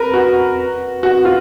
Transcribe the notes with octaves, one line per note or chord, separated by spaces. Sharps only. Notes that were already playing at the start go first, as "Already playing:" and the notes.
Already playing: A#4 B4
F#4
F#4
F4